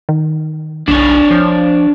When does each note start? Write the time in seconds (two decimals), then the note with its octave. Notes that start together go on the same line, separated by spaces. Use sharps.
0.09 D#3
0.88 F#1 B1 D4 C#5
1.31 F3